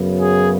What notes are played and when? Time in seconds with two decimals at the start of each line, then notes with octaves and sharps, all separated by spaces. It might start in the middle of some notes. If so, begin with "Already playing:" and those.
Already playing: F#2 C#3 F#3 B3
0.20 G#4